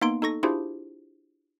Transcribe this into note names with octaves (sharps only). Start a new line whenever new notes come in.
A#3 B3 D#4 C6 D7
D#4 A4 C#6 A#6
D4 E4 F4 G4 G#4 C5